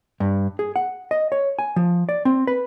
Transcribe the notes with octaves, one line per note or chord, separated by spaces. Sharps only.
G2
G#4
F#5
D#5
C#5
G#5
F3
D5
C4
B4